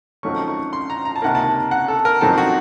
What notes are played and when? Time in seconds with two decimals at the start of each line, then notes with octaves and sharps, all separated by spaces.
0.23 F2 D#3 F#3 A3 C#4 C#6
0.48 C#6
0.73 C6
0.90 A#5
1.05 A#5
1.16 A5
1.22 C#2 C3 D#3 A#3 F#5
1.35 A5
1.71 F#5
1.88 A4
2.05 A#4
2.21 F2 D#3 F#3 C4 A4
2.38 F#4